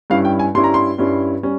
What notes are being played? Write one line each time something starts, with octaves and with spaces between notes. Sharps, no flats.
G2 G3 C#4 E4 F5
G5
G#5
G2 G3 C#4 E4 C6
A#5
C6
G2 G3 C#4 E4
G3 C#4